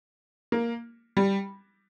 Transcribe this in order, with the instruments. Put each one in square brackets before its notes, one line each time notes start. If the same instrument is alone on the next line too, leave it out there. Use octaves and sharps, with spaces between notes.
[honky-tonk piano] A#3
G3